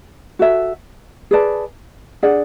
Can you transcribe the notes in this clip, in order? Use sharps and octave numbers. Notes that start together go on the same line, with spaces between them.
F#4 A4 E5
G#4 B4 D5 A5
D4 G#4 D5 F#5